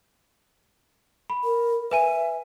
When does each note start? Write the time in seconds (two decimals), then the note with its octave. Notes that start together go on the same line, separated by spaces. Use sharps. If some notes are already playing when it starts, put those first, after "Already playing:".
1.30 B5
1.44 A#4
1.91 B4 E5 G#5 D#7